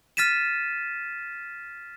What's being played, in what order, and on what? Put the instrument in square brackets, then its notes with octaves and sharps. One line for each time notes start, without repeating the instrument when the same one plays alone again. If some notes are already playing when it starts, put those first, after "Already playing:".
[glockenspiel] F6 A6 B6 D#7 E7